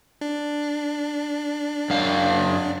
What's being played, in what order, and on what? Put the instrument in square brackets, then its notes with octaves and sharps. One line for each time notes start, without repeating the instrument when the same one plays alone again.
[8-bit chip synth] D4
[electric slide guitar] F#2 F5